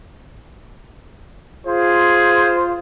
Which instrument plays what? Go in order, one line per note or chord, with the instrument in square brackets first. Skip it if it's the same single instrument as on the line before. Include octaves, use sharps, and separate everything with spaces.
[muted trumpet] F4 [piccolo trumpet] G#4 [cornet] C5